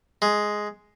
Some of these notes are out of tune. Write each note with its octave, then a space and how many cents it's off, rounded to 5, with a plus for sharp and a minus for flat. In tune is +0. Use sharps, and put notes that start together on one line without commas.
G#3 +5